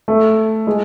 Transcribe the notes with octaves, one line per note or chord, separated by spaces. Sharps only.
A3
G#3